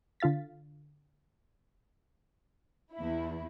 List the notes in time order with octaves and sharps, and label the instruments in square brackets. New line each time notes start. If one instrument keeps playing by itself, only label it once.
[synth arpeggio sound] D3 F4 F5 A6 B6
[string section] E2 E4